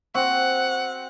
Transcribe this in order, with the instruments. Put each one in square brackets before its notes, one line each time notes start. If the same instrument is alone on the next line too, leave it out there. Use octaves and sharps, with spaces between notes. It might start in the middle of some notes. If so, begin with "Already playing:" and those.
[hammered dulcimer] C4 F#4 [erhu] F#5